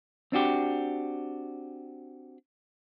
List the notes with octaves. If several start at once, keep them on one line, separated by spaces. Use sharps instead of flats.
C4 D4 F#4 G4